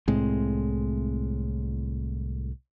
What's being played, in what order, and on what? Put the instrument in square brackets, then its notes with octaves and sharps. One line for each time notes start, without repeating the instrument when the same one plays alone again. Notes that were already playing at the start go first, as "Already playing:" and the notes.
[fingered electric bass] C2 A2 G#3 C4